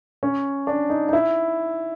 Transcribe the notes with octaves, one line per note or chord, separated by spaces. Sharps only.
C#4
D4
D#4
D#4
E4